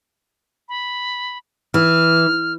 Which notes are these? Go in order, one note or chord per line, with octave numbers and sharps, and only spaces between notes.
B5
E3 F6